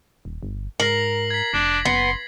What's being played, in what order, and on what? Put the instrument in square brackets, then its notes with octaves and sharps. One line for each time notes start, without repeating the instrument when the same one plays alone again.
[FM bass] D#1
G1
[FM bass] G#2 [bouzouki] A#4 [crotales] A#6 C7 F#7
[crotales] G#6 B6
[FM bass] F1 [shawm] D4
[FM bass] F#1 [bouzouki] B3 [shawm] C6